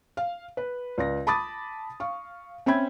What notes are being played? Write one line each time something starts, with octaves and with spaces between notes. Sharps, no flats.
F5
B4
C#2 D5 A#6
A5 B5 D6 D#6 A6
F5 C#6
C4 C#4 E5 G5 B5 G#6